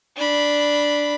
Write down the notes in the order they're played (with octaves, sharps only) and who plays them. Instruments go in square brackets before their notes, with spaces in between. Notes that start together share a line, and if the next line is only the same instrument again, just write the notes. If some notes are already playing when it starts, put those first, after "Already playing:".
[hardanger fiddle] D4 B5